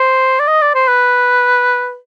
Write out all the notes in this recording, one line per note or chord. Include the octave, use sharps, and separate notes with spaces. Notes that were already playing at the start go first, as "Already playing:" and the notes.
Already playing: C5
D5
D#5
D5
C5
B4